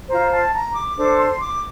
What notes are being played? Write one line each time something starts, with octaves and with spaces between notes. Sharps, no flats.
F4 C5 A#5
A5
A#5
D6
D4 A4 C5 D6
C6
D6